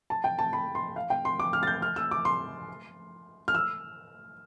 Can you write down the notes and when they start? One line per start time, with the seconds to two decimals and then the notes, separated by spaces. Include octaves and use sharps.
0.10 A5
0.24 G5
0.39 A5
0.53 B5
0.75 C6
0.96 F5
1.10 G5
1.25 C6
1.40 D6
1.53 F6
1.63 A6
1.67 G6
1.82 F6
1.96 E6
2.11 D6
2.25 C6
3.48 F6
3.55 E6